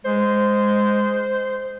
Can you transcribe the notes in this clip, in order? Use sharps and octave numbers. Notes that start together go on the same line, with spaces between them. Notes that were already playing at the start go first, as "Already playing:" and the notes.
G#3 C5